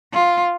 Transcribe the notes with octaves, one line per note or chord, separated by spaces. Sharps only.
F4